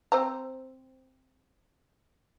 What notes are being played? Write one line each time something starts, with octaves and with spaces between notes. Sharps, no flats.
C4 C5 A#5